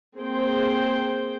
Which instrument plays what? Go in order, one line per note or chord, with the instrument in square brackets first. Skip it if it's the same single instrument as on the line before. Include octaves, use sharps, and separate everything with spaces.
[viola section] A#3 C4 G#4 C5 G5